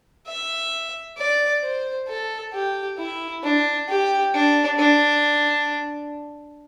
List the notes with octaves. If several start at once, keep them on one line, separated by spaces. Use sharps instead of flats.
E5
D5
C5
A4
G4
E4
D4
G4
D4
D4